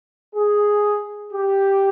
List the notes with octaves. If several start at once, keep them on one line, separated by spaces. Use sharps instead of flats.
G#4
G4